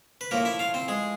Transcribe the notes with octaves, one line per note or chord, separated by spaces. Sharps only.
B4
A2 F3 A#3 A#4
E4 E5
F4 F5
C4 C5
G#3 G#4